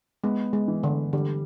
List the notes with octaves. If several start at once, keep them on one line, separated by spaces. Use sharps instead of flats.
G#3 B3
G#3
E3
D3
D3 G3